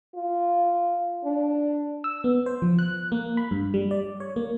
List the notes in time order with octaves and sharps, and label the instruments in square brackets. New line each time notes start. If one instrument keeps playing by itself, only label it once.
[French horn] F4
D4
[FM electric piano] E6
B3
C5
F3
F#6
A#3
B5
G2
G3
D5
C#5
A#3